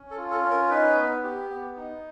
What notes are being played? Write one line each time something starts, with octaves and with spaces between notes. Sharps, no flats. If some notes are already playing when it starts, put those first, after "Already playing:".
Already playing: C#4
A4
F4
A4
C#4
A#4
D#4 B4
B3
G4
B3
D#4